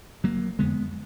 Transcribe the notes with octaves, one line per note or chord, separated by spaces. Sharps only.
F#1 F#3 A#3
F2 D3 G#3 B3